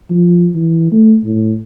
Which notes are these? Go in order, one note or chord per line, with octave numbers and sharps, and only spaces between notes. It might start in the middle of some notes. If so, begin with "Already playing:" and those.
F3
E3
A3
A2